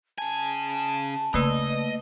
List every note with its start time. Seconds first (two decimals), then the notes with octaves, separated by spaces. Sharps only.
0.18 C#3 G#5 A5
1.34 C#3 A3 A#3 B4 D#5